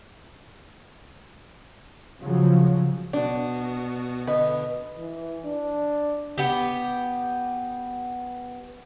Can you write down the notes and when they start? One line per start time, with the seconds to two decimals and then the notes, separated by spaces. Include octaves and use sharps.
2.21 C#3 F3 F#3
3.13 B2 B3 D4 F#4
4.27 B2 D3 B4 D#5
4.98 E3
5.45 D4
6.38 B3 G4